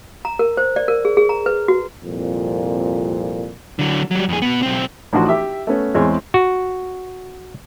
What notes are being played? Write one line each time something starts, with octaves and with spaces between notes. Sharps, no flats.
A#5
A#4
C5
D5
A#4
G#4
G#4
A#5
B4
F#4
C2 F2 A#2
D3 F#3
F#3 G3
F2 G#4
B2 B3
B1 C4
A1 F3 D4 D#4 F#4 C6
G4 E5 D6
A3 B3 C#4
E2 G#3 C4 C#5 G#5
F#4